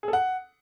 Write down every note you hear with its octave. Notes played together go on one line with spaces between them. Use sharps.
G#4
A4
F#5